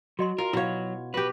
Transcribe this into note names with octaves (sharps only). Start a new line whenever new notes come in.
F#3 F#4 D#5 C6
F4 A#4
B2 F#3 E4 C#5 F5
F#4 G4 B4